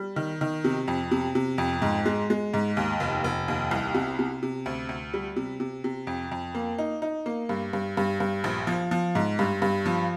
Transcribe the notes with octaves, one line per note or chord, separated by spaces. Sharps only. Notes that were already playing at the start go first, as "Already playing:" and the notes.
Already playing: G3
D#3
D#3
C3
F2
C3
C3
F2
G#2
G#3
G#3
G#2
D#2
F1
F1
D#2
C2
C3
C3
C3
D2
D2
G3
C3
C3
C3
F2
F2
A#3
D#4
D#4
A#3
G2
G2
G2
G2
A#1
F3
F3
G#2
G2
G2
F3